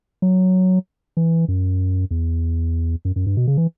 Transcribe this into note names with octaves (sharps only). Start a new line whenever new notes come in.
F#3
E3
F#2
E2
F#2
F#2
G2
B2
C#3
E3